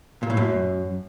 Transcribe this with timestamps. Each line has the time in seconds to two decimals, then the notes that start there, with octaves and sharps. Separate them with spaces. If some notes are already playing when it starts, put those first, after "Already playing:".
0.23 A#2
0.30 A2
0.37 F#2